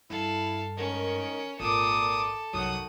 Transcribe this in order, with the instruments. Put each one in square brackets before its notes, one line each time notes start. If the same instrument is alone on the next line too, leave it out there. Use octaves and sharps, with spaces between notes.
[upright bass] G2 [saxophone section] E4 [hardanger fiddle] A4 F5
[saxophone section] G#2 D#3 [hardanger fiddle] C#4 [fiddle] A#4
[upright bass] G#1 [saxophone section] A#2 [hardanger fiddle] A4 [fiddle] D6 D#6
[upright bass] C2 F#2 [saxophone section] D#3 F#3 [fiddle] F#5 D#6